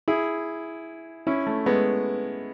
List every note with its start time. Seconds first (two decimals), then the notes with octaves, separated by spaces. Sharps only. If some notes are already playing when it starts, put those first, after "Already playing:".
0.08 E4 G#4
1.27 C#4 E4
1.47 A3
1.66 G#3 B3